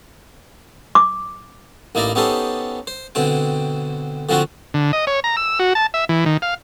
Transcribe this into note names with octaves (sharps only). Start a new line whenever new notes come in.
D6
A1 A#3 D#4 E4 D5 A#5
B3 C#4 D#4 G4 A4 C5
C5
B2 D3 C4 G5
D3 F3 C4 F4 F#4
D3
D#5
C#5
A#5
E6
F#4
A5
E5
E3
D#3
F5